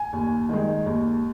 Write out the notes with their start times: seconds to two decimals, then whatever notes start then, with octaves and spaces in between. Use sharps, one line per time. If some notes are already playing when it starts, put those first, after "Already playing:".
Already playing: G#5
0.13 D#2
0.49 D#3 G#3
0.86 D#2